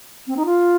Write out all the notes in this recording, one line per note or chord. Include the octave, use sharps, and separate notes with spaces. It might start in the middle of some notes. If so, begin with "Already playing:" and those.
C4
D#4
F4